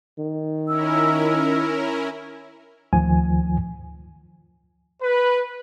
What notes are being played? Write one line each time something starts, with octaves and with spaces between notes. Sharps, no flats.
D#3
C#4 E4 A#4 E6
D2 D#3 F3 G#5
B4